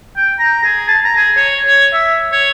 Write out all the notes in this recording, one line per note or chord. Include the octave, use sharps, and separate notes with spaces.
G5
A#5
G#4
A5
A#5
G#4
C#5
C#5
E5
C#5